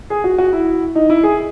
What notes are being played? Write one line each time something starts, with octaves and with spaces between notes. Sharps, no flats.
G#4
F#4
F#4
E4
D#4
E4
G#4